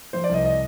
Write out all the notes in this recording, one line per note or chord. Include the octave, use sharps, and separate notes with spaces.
F3 C5
D5
C2 D#5
D#5